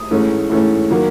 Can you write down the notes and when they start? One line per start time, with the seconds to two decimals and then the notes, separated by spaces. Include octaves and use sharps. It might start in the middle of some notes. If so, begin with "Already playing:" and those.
Already playing: D#6
0.11 G#2 E3 A3 C#4
0.49 G#2 E3 A3 C#4
0.90 D#3 F#3 A#3